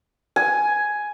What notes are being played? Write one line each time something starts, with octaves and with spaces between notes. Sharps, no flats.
G#5